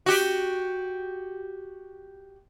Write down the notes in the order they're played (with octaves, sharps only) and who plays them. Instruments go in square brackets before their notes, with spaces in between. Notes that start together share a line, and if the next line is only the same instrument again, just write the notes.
[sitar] F#4 G4